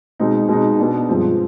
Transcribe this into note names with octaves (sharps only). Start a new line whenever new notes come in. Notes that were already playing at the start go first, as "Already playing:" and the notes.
B2 G#3 C4 D#4
B2 G#3 C4 D#4
B2 B3 D4
G2 F3 G#3 C4